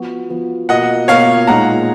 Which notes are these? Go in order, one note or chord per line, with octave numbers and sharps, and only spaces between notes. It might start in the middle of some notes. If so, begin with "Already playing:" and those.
Already playing: F3 B3 F#4
F3 B3 F#4
B2 A#3 F4 D#5 F#5
B2 A#3 F4 C#5 F5
A#2 G#3 D#4 F#5 A#5